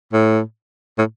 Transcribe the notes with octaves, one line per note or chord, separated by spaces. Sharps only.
A2
A2